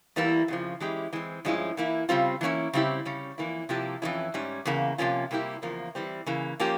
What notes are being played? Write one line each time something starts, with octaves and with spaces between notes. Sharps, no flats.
E2 E3 G3 A#3 E4
F2 C#3 F3
E3 G#3 C#4 E4 G4
E3 G#3 C4
G2 F3 G#3 C#4 E4
E3 A#3 E4
C#3 G3 C4 F4
E3 A#3 C#4 E4
C#3 G3 C4 E4 G4
C#3 G3 C#4
F2 E3 A#3 E4
C3 F3 A#3 E4 G4
F2 E3 G#3 C#4 E4
G#2 G3 C#4
E2 C#3 A#3
C3 F3 A#3 C#4 F4
C3 G3 A#3 E4 G4
E2 C#3 F3 A#3
E3 G3 C4
C#3 E3 A#3
F3 A#3 C#4 G4